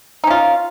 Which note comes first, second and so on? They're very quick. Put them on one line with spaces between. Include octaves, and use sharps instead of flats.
D#4 C#4 F4